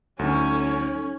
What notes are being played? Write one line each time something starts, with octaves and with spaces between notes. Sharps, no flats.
D2 F#3 C#4 D#4 A4